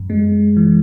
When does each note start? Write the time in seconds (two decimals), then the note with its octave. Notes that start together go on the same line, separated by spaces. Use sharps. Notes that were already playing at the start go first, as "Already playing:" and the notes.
Already playing: F#2
0.10 G#3
0.57 E3